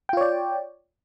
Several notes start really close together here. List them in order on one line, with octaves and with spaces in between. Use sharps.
G5 F4 C#5 D5